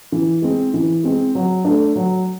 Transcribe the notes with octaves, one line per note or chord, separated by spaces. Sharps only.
E3
G#3 C4
E3
G#3 C4
F#3
A3 D4
F#3